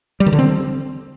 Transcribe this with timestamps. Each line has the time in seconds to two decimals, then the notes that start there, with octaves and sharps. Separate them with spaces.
0.20 G3
0.26 D#3
0.32 D3
0.39 C4